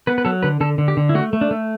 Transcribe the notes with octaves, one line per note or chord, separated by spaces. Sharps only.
B3 B4
B4
F#3 A4
D3 B4
D3 A4
D3
G4
D3
E4
A3 F#4
A3
D4
A3